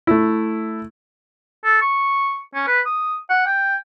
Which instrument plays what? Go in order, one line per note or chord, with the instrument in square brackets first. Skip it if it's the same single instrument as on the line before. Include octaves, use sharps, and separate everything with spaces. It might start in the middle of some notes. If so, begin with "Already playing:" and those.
[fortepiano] A3 E4
[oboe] A4
C#6
C#4
B4
D#6
F#5
G5